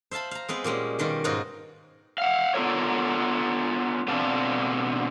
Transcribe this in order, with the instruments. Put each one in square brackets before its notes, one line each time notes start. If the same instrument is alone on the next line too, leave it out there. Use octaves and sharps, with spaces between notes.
[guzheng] C5 E5 F5 A5 B5
F5 A#5
G#3 B3 C4 B4
A#2 G3 G#3 C#4
B2 D#3 G3 F4
G#2 D#4 F4 F#4 B4 C#5
[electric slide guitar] F5 F#5
B3 D4 F4 A4 A#4 C#5
B2 D3 C4 D4 F5 A5